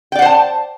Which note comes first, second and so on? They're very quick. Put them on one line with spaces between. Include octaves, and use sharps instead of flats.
G5 D5 F#5 C5 A5